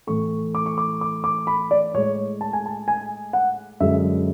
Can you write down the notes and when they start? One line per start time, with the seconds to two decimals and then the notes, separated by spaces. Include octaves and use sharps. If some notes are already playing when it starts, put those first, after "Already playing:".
0.07 A2 E3 A3 C#6
0.55 D6
0.66 C#6
0.78 D6
1.01 D6
1.24 D6
1.47 B5
1.71 D5
1.94 A2 G#3 C#5
2.41 A5
2.53 G#5
2.66 A5
2.88 G#5
3.33 F#5
3.80 F#2 D3 G#3 E5